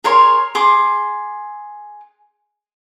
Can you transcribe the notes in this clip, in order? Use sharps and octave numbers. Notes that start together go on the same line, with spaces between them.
G#4 A#4 C#5 C6
G#4 C6 D6